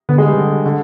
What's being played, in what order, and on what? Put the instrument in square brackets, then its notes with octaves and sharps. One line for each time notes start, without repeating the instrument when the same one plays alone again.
[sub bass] D3 [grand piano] B3
[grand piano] G#3
G3
D3
D3